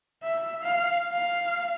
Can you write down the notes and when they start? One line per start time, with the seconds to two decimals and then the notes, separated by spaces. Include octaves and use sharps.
0.23 E5
0.63 F5
1.12 F5